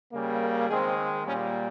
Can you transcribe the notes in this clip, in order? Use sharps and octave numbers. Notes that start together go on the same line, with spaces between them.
C#3 G3 A#3
A#4
D#3 G#3 C4 G#4
C4
A#2 G3 A#3 C#4